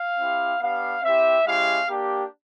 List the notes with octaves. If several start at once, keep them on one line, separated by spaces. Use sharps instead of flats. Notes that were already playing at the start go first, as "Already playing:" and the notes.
Already playing: F5
C4 E4 G4
B3 D4 G4 F5
C4 E4 G4 E5
G#3 C#4 E4 G4 F5
A#3 D4 G4